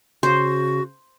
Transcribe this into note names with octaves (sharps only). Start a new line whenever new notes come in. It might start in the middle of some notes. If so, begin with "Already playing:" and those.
C#3 F#4 C5